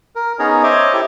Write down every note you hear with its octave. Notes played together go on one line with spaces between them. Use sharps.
A#4
B3 C#4 D#4 G#4 C#5 A#5
C5 C#5 D#5 E5 D6
E4 G4 A4